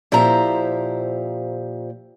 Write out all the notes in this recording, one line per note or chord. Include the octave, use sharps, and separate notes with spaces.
A#2 F3 E4 G4 C5 A#5